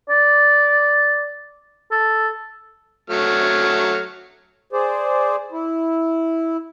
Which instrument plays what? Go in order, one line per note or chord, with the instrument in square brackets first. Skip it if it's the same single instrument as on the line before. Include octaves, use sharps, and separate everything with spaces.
[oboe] D5
A4
[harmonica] F#3 A3 F6
[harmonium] G#4 C5 D5
E4